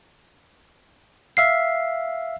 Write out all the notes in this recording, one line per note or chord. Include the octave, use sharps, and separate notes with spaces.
E5 F5 C7